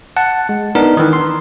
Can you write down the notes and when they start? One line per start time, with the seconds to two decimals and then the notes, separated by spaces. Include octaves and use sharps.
0.17 F#5 A5
0.49 G#3
0.75 B3 D4 D#4 A#4
0.97 D#3 E3
1.13 C6